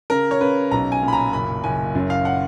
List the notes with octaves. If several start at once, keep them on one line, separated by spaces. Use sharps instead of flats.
C#3 A#4
C#5
C#3 B4
B1 A#5
G#5
A#2
B5
A#5
F#1 B5
F#1 G#5
F#2
F5
F#5